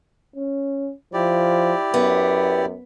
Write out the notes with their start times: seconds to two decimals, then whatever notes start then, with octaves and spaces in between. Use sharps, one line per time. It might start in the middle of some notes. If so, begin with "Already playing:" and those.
0.36 C#4
1.14 F3 E4 G4 D5
1.94 F#2 B3